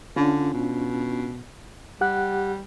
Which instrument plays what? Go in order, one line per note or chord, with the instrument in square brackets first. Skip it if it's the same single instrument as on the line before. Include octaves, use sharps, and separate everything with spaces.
[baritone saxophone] D3 [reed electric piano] C#4 D4 F4
[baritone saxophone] B2
[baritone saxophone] G3 [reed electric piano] G4 F#5 F#6